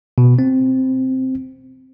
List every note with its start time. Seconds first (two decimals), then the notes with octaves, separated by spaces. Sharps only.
0.18 B2
0.39 C4